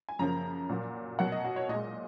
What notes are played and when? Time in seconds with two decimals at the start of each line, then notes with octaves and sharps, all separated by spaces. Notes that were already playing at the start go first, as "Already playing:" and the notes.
0.09 G#5
0.19 F#2 C#3 F3 A#3 A#5
0.69 A#2 F#3 A#3
1.19 B2 F#3 A#3 F#5
1.32 D#5
1.44 F#4
1.56 C#5
1.69 A#2 G#3 D#5